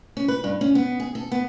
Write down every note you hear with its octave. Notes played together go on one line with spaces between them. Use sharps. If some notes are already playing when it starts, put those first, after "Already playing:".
C#4
B4
G2
C#4
B3
G#4
A4
B3